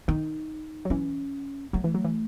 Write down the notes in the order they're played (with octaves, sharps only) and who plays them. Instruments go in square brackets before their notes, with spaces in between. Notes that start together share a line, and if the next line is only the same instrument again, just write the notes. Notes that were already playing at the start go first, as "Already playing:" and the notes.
[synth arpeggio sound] D#3 [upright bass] D#4
[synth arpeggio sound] F#3
[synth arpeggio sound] E3 [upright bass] C#4
[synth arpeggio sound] F#3 [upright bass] A3
[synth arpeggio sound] E3
F#3
E3